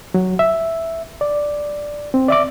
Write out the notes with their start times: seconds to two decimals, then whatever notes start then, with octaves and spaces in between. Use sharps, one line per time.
0.14 F#3
0.39 E5
1.21 D5
2.14 C4
2.28 D5 E5 D6